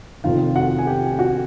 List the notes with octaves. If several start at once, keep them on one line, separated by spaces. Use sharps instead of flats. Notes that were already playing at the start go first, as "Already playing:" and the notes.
F1 F2 C3 D#3 F4 F5
F#4 F#5
G#5
G4 G5
F#4 F#5